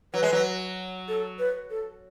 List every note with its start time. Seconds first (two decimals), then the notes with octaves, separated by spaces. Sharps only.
0.14 F#3 B4
0.23 G#3
0.33 F#3
1.08 A4
1.39 B4
1.70 A4